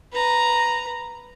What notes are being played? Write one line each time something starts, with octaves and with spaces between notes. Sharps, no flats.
B4 A#5